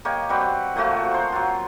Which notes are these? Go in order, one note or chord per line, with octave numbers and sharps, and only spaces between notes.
A#3 G4 C#5 D#5
G3 C4 F#4 B4
A#2 F3 A3 F#4
A#4 C5
F#3 F4